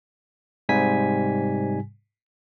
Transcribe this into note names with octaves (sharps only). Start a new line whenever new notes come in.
G#2 C3 G3 G#5 B6